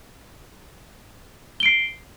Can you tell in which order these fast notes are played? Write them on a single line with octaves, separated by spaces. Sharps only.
G7 D7 C7